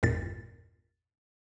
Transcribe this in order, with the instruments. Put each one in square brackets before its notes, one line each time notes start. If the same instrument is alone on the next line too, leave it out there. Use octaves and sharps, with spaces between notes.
[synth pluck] G#1 E2 G2 A#2 A6